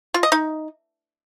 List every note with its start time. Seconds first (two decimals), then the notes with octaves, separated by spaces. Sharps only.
0.14 F4
0.23 D#5
0.32 D#4